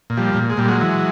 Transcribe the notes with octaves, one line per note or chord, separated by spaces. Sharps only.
A#2
F3 G3
A#2
G#3
A#2 G3
F#3 G#3
E3